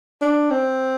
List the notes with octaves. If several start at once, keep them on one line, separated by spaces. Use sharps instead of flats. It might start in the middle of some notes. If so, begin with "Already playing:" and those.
D4
C4